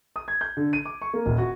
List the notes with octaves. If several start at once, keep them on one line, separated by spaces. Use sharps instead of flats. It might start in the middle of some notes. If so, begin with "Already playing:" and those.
D#6
G#6
G6
D3
D#7
D6
C#6
A#3
D#1
F#4